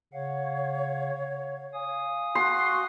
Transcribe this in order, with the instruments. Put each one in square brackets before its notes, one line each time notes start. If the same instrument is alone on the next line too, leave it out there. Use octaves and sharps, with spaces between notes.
[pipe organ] C#3 F5 F#5 [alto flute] C#5
[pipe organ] F5 G#5 D#6
[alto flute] F#4 [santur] C6